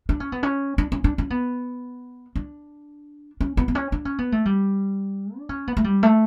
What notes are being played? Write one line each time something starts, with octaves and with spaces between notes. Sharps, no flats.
D4
C#4
B3
C#4
D4
C#4
D4
C#4
B3
D4
C#4
B3
B3
C#4
D4
C#4
B3
A3
G3
D4
C#4
B3
A3
G3
A3